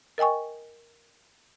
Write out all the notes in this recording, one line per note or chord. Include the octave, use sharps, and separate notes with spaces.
A#4 D#5 G5 G#5 C#6